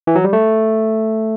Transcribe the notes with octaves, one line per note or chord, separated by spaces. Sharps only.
E3
F#3
G3
A3